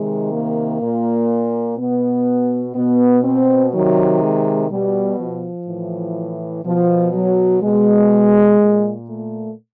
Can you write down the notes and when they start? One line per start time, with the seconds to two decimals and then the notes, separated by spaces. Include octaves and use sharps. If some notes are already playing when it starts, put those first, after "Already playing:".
Already playing: C3 D#3 G#3
0.32 A#3
0.81 A#2
1.78 B2 B3
2.76 B2 B3
3.24 C4
3.73 C3 D#3 F#3
4.22 G#3
4.70 B2 G3
5.19 F3
5.68 A2 E3
6.65 B2 F3
7.13 F#3
7.62 B2 G#3
8.59 A#2
9.08 A3